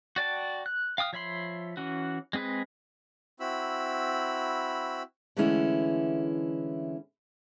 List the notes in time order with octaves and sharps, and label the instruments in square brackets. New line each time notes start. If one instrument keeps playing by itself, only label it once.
[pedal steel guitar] F#4 D5 G5 A5
F#6
F5 G5 D#6 F6
F3 C#5 E5 B5 C6
E3 C#4 F#4
G#3 C4 G#4 B4
[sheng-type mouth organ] C4 E4 F#4 B5 E6
[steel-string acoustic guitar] D3 E3 G#3 A3 C#4 E4